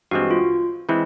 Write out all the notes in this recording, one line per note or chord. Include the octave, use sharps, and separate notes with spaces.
G2 E3 G#3 C4 F#4
F4
E3 G#3 C4 E4